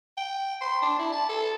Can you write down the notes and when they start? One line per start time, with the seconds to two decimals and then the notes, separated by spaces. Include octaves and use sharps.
0.17 G5
0.61 C6
0.82 D4
0.99 E4
1.12 A5
1.29 A4